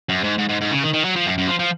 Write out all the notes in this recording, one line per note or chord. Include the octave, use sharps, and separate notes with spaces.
F#2
G#2
G#2
G#2
G#2
C#3
D#3
D#3
F#3
F3
F#2
F#2
F3
F3